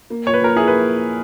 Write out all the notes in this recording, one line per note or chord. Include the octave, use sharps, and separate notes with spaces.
A#3
A#2 C#5
B4
A#2 A#4
E4 G#4
A#3 B4